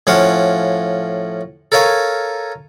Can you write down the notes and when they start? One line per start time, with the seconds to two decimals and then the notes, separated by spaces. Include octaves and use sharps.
0.07 A2 F3 C#4 F5 F#5
1.72 A4 A#4 C#5 F5 G#5